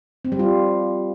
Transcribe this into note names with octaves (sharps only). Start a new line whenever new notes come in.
C4
G3
F4